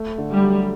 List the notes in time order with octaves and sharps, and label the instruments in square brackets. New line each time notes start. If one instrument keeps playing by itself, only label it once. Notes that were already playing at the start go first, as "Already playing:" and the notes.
Already playing: [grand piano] A3
D3
[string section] G3
[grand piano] F#3